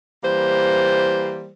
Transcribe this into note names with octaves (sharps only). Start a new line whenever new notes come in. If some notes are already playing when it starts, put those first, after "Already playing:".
E3 G3 A#3 C5